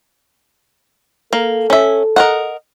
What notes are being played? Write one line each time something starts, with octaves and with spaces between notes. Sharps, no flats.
A#3 A4
C#4 E5
A#4 D#5 F#5